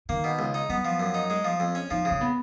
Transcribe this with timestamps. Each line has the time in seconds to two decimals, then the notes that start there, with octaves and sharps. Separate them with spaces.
0.09 D#3 A#3
0.24 B2
0.39 C#2
0.54 D#4
0.69 F#3 B3
0.85 F3
1.00 F#2
1.14 D#4
1.30 G#3
1.45 F3
1.60 F2
1.75 C#4
1.91 F3 D#4
2.05 C#3
2.11 C#4
2.21 B3